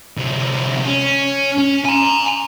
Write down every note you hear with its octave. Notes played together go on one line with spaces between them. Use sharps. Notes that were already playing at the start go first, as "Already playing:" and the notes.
D2 C3
C#4
C#4
G#5 A#5